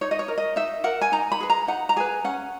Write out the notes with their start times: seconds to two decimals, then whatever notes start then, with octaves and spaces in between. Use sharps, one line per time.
0.01 D#4 C#5
0.11 D#5
0.19 C#5
0.28 A#4
0.38 D#5
0.56 D#4 E5
0.84 A#4 F#5
1.01 G#5
1.12 D#4 A#5
1.32 B5
1.40 G#4 B4
1.50 A#5
1.68 D#4 F#5
1.89 A#5
1.96 G#4 B4 G#5
2.24 C#4 F#5